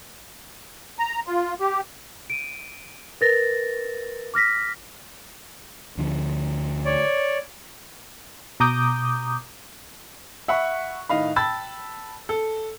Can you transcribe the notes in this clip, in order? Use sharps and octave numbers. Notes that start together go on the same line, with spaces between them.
A#5
F4
G4
D7 D#7
A#4 B4 A6 A#6
D6 F6 A#6 B6
D2 D3 F3
C#5 D5
B2 A#5 D6 D#6 G6
E5 F#5 B5 C#6
A2 D#3 D#5 F5 B5
G5 A5 B5 E6 A6
A4